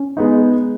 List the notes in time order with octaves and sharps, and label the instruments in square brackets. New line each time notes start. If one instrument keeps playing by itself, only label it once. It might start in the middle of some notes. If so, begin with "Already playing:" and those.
Already playing: [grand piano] C#4
[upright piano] G#3 B3 D#4